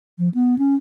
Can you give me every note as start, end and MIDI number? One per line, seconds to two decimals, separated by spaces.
0.19 0.29 53
0.34 0.58 59
0.58 0.75 61